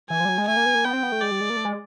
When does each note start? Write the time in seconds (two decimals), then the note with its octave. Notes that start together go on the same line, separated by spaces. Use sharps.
0.10 E3 G#5
0.20 F3
0.25 G3
0.29 F#3
0.38 G#3
0.48 A3 G#5
0.57 A#3
0.66 B3
0.75 A#3
0.84 B3 G5
0.93 C4
1.03 B3
1.12 A3
1.21 G#3 D5
1.31 G3
1.41 G#3
1.50 A#3
1.57 A3
1.65 G#3